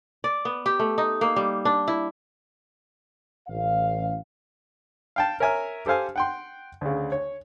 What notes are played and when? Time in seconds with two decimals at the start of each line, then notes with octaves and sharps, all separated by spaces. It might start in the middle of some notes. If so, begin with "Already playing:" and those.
0.24 D5
0.45 B3
0.66 G4
0.79 A3
0.98 D#4
1.21 A#3
1.36 G3
1.65 D4
1.88 E4
3.48 A1 F5
5.16 F5 G5 A5
5.40 A#4 C#5 E5 G#5 A#5 F6
5.86 G4 A4 C5 F5 G#5
6.16 F#5 G5 C6
6.81 D2 C#3
7.12 C#5